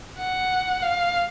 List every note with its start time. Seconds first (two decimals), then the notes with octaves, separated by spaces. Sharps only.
0.19 F#5
0.83 F5